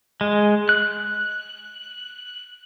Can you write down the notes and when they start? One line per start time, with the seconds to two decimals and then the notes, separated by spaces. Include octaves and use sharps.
0.21 G#3
0.69 F#6